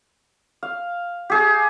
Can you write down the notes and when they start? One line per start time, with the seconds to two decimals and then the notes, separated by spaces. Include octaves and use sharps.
0.63 F5
1.30 G4 G#4 A5